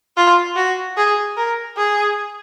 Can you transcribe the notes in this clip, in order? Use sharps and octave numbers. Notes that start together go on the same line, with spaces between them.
F4
F#4
G#4
A#4
G#4